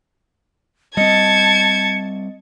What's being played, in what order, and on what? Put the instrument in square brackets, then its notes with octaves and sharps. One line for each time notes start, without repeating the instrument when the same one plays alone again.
[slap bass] G3 C4 [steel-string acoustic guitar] D#5 [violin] A5 G#6 [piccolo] C#7